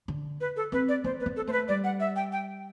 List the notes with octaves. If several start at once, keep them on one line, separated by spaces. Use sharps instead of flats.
D3
B4
A4
C4 B4
D5
B3 C5
B4
B3
A4
A3 C5
B4
G3 D5
F#5
E5
G5
G5